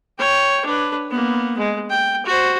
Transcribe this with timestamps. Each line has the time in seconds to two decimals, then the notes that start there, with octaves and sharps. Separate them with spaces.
0.19 C#5 G5
0.65 D4 B4
1.11 A#3 B3
1.58 G#3
1.90 G5
2.26 F#4 C5